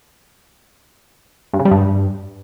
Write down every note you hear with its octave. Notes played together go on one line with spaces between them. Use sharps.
G2
C#3
G3
G2